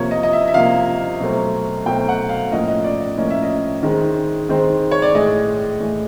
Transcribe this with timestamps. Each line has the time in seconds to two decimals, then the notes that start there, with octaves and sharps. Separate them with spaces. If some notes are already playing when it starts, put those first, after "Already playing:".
Already playing: C3 F3 A#3 C#5
0.11 D#5
0.23 D#5
0.33 E5
0.48 E5
0.54 C3 F3 A#3 F5
1.20 B2 F#3 A3 C4
1.86 B2 F#3 A3 C4 G5
2.09 F#5
2.29 F5
2.51 A2 F3 A#3 C#4 D#5
2.68 D#5
2.84 D5
3.00 D#5
3.17 A2 F3 A#3 C#4 D#5
3.30 E5
3.43 D#5
3.83 D#3 G#3 C4
4.49 D#3 G#3 C4
4.91 C#5
5.02 D5
5.14 A2 E3 G#3 D#5
5.80 A2 E3 G#3